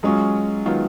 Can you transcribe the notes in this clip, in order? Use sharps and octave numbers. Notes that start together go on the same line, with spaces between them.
F#3 G#3 C#4 F4
D#3 F#3 B3 F4